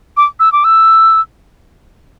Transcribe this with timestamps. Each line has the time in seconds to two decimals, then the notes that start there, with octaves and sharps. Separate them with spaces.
0.17 D6
0.40 E6
0.52 D6
0.64 E6